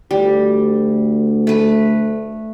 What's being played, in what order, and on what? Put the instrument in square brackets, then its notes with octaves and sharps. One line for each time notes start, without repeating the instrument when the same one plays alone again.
[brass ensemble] D2 [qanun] G3
[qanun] A3 B4